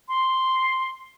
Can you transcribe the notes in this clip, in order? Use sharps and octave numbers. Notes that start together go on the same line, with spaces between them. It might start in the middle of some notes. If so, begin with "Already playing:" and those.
C6